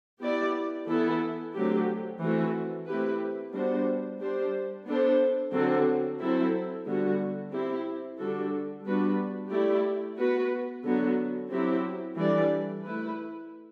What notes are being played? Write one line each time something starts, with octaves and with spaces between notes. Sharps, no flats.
B3 E4 G4 D5
E3 B3 E4 A4
D3 F#3 A3 C4 G4
E3 A3 C4 F#4 A4
A3 C4 E4 G4 B4
G3 B3 D4 F#4 C5
G3 D4 G4 C5
B3 D4 A4 C5
D3 F#3 C4 F#4
F#3 C4 E4 A4
D3 G3 B3 F#4
C4 E4 G4
D3 G3 D4 F#4 A4
G3 B3 D4 F#4 B4
A3 E4 G4 D5
B3 F#4 B4
D3 F#3 B3 F#4
F#3 C4 E4 G4
E3 G3 D4 A4 D5
A3 E4 B4